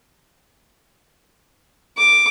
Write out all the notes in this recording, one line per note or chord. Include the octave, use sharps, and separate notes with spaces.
D6